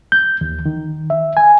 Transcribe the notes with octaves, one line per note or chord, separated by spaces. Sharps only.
G6
D#2
D#3
E5
G#5